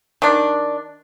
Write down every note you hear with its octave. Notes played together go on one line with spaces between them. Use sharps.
D#3 D4